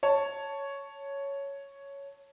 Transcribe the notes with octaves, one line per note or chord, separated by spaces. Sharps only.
C#5 A5